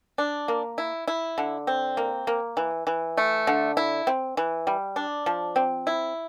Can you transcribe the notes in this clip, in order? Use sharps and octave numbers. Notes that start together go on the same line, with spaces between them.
D4
A#3
E4
E4
D3
C4
A#3
A#3
E3
E3
A3
D3
E4
C4
E3
G3
D4
F3
C4
E4